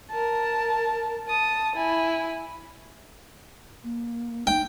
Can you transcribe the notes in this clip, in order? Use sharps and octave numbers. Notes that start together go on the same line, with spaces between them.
A#4 A5
A5 D#6
E4 G#5
A#3
D#4 G5